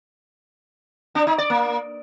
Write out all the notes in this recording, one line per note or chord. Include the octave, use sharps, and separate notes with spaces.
D4
D#4
D5
A#3